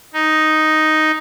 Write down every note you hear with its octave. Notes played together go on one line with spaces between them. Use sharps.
D#4